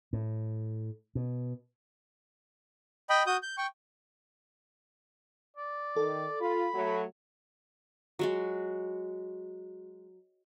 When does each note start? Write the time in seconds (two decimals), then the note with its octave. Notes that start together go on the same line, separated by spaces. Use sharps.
0.13 A2
1.15 B2
3.10 D#5 G5 B5
3.27 F#4 D#6 G6
3.43 G6
3.58 G5 C#6
5.57 D5
5.96 D#3 A4
6.41 F4 B5
6.74 F#3 A3
8.19 F#3 G#3 F#4